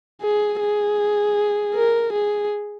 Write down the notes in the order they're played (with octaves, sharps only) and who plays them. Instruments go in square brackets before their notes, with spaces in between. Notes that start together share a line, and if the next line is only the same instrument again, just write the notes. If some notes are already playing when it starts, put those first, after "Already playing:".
[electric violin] G#4
G#4
A#4
G#4